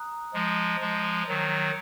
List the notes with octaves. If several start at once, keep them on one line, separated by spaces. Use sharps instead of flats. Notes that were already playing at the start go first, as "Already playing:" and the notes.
Already playing: A#5 D#6 F#6
F3 G#3
F3 G#3
D#3 F#3